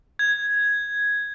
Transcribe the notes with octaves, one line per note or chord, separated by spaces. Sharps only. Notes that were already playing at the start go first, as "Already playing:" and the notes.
G#6